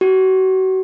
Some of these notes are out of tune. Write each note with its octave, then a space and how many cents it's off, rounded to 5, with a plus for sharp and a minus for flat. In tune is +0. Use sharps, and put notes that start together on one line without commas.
F#4 +35